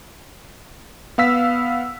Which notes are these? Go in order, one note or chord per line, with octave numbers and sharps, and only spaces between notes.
B3 F5 E6 B6